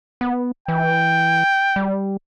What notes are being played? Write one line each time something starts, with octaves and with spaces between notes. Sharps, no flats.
B3
E3 G5
G3